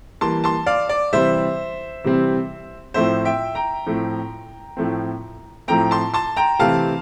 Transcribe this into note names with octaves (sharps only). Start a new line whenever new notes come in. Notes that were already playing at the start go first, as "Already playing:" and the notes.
E3 G3 A#3 A5 C6
A5 C6
D5 F5
D5
C3 E3 G3 C4 C5 E5
C3 E3 G3 C4
A2 F3 A3 C4 C5 E5
E5 G5
G5 A#5
A2 F3 A3 C4
A2 F3 A3 C4
A2 F3 A3 C4 G5 A#5
A5 C6
A5 C6
G5 A#5
C3 E3 A3 C4 F5 A5